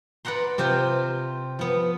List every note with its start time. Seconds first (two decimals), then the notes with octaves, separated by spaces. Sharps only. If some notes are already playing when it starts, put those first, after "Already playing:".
0.25 B4 D5 F#5 A#5 C6
0.58 C3 C4 F4 G4 C5
1.59 F3 B3